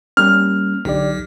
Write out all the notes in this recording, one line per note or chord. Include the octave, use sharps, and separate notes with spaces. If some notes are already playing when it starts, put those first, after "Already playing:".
G3 A#3 C#4 F6
B1 D3 G4 D5